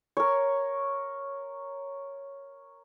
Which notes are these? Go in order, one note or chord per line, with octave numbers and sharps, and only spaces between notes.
A#4 C#5